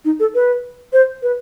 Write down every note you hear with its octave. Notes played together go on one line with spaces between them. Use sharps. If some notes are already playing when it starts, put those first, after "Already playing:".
D#4
A4
B4
C5
B4